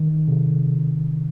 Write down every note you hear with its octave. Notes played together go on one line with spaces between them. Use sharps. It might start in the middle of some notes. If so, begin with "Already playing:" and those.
Already playing: D#3
C3